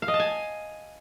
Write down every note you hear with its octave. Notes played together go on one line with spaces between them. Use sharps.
F5
D#5
A5
G#5